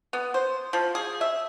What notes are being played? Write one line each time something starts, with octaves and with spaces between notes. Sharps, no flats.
B3
C5
F3
G#4
E5